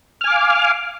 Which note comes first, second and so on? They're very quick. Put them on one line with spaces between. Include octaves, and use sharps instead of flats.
F6 G#5 D6 F5